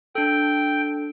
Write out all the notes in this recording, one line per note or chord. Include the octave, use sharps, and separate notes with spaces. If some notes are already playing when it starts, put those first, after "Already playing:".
D4 A4 G5